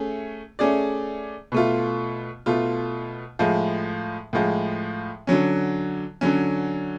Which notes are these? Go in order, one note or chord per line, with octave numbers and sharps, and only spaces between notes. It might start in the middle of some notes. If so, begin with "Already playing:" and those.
Already playing: A3 C#4 G#4
A3 C#4 G#4 D5
B2 A3 F4
B2 A3 F4
A2 F3 G#3
A2 F3 G#3
D3 F#3 C#4
D3 F#3 C#4